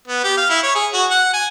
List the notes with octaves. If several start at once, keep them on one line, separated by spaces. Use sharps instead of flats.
B3
G4
F5
E4
C#5
G#4
F#4
F#5
G#5